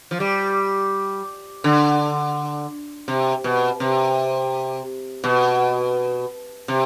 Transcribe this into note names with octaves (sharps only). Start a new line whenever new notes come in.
F3
G3
D3
C3
B2
C3
B2
C3